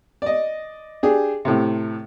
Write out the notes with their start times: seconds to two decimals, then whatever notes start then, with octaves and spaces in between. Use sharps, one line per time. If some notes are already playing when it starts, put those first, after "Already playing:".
0.22 D5 D#5
1.03 D4 G4 G#4
1.45 A2 C3